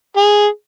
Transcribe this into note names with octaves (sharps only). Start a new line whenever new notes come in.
G#4